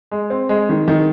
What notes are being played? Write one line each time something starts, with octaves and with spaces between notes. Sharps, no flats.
G#3
C4
G#3
D#3
D#3